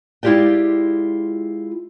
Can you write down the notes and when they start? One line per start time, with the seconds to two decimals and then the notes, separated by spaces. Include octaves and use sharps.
0.23 G#3 E4 F4 G4 D5 G5